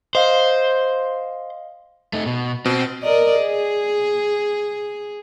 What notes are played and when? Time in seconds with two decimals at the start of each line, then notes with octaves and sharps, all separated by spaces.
0.15 C5 D#5 F5
2.13 A3 D#4
2.26 B2
2.66 B2 C4
3.03 A#4 D5 D#5
3.42 G#4